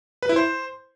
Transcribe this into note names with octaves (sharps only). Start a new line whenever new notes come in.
B4
E4
C5